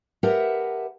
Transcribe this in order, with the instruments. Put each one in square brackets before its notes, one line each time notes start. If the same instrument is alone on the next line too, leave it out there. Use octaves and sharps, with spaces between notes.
[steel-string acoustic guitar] G4 A#4 B4 E5 F#5 A5